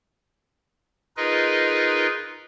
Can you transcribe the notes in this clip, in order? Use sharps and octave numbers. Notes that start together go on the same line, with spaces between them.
D#4 F4 G#4 A#4 B4 D#5